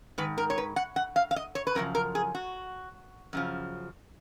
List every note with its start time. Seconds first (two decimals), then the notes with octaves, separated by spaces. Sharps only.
0.18 G#2 D#3 B4
0.38 A#4
0.50 C#5
0.58 B4
0.76 F#5
0.96 F#5
1.16 F5
1.31 F5
1.36 D#5
1.55 C#5
1.67 B4
1.75 F#2 C#3 F3 A#4
1.95 A#4
2.15 G#4
2.35 F#4
3.33 F#2 C#3 F3